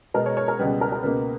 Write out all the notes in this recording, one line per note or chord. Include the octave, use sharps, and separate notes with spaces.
B2 G#3 B3 A#4
C#5
C#5
A#4
C#2 B2 G3 B4
A#4
A#4
C#2 B2 A#3 B4